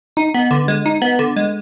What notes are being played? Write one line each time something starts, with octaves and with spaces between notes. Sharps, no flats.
D#4
B3
D3
G#3
D#4
B3
D3
G#3